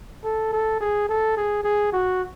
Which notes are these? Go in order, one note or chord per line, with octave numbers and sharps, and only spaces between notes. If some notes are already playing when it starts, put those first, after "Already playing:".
A4
A4
G#4
A4
G#4
G#4
F#4